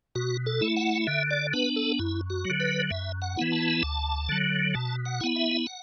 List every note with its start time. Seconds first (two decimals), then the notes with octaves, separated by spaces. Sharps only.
0.15 B2 F#4
0.46 A4
0.61 A3 E4
0.76 F#5
1.07 D3 E5
1.31 D5
1.53 B3 D4 B4
1.76 A4
1.99 F#2 E4
2.30 F#4
2.45 F#3
2.50 D3
2.60 B4
2.90 F#2 E5
3.22 F#5
3.37 E3 B3 E4
3.52 A5
3.83 D2
4.29 D3 F#3
4.74 B2 A5
5.06 F#5
5.21 B3 E4
5.36 E5
5.66 F#5